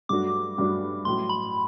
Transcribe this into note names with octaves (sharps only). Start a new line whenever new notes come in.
G2 F#3 A3 D4 F#4 D6
G2 F#3 A3 D4 F#4
A1 A2 F#3 C6
B5